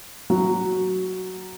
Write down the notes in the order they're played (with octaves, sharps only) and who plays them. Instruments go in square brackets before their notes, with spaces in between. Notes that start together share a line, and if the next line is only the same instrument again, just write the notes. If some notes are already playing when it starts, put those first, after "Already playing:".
[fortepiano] F#3